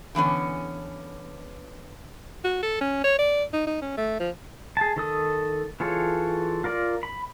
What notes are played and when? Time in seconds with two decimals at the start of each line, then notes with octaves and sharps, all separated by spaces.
0.15 D3 E3 B3 C#4
2.44 F#4
2.62 A4
2.81 C#4
3.04 C#5
3.19 D5
3.53 D#4
3.67 D#4
3.82 C#4
3.97 A3
4.20 F3
4.77 G#4 A5
4.96 D#3 A4 D#6
5.80 E3 F4 G#4 A4 C#5
6.64 F4 A#4 D5
7.03 B5